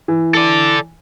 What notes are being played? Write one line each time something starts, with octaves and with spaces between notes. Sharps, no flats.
E3
A4 D5